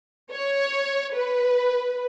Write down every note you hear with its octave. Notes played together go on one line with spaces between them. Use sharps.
C#5
B4